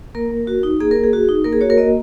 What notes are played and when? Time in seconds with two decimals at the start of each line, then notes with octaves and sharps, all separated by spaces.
0.15 A#3 A#4
0.31 A#3
0.47 F#4
0.63 D#4
0.80 A#3 G#4
0.91 A#3 A#4
1.04 G#4
1.13 F#4
1.29 D#4
1.44 A#3 A#4
1.53 G#4
1.61 F#4 C#5
1.70 A#4
1.77 A#3 D#5